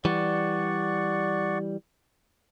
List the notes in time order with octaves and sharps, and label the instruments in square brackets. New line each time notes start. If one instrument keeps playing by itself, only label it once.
[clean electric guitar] E3 G3 [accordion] D5 F#5 C#6